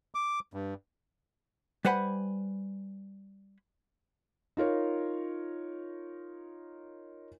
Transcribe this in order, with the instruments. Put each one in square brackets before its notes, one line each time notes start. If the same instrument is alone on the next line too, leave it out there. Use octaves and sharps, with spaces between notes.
[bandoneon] D6
G2
[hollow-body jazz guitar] G3 B4 C5 F#5 G#5 B5
[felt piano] D#4 F4 A#4 C#5